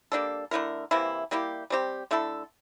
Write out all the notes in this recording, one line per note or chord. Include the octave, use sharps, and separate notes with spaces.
G3 A#3 D4 A4
D3 A3 E4 A#4
C3 E3 A#3 E4
G3 A#3 E4 G4
G3 C4 G4
D3 A3 E4 A4